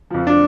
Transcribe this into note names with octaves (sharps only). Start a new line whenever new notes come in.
F2 F3
D4